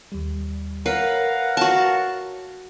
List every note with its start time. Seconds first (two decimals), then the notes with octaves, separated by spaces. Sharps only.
0.12 D#2 G3
0.86 A#4 B4 C#5 F5 F#5 A#5
1.57 F#4 A5